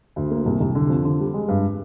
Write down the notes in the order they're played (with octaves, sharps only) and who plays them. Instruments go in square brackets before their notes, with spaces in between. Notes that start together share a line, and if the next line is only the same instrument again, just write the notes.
[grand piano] D2
A#3
C2
C2
D3
F2
D3
G3
G#3
G2